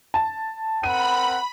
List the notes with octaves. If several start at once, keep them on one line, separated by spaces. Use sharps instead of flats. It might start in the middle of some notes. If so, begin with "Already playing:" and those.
A5
C4 A#4 F#5 B5 D#7